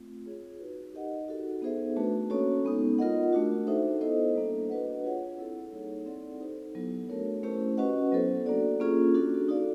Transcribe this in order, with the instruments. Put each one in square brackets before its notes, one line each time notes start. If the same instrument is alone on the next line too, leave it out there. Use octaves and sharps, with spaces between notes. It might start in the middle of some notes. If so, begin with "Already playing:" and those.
Already playing: [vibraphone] A3 C4 F4
F4 G#4 C#5
D#4 F#4 B4
D#4 G4 A#4 D#5 F#5
D#4 F#4 A4
B3 D#4 G#4 C5 E5
A3 D4 F#4 B4
A#3 C#4 F#4 A4 C#5
G#3 B3 D#4
F4 A#4 D#5 F#5
A3 D4 F#4
D#4 F#4 A4 C5 E5
B3 E4 A4 C5 D#5
G3 A#3 D4
D4 F#4 B4 D#5 F#5
F4 G#4 C#5 F#5
C4 E4 A4
G3 A#3 D#4 G#4 C#5
C4 E4 A4 D5 F#5
D#4 G4 C5
F#3 B3 E4 A4
A3 D4 F#4 A#4 C#5
A3 C#4 E4 G4 C5
C#4 F#4 B4 D#5 F#5
F#3 B3 E4 A4 C5
A#3 D4 F#4 A4 D5
A#3 C#4 F4 G#4
D4 F#4 A4
D#4 F#4 A4 D5 F5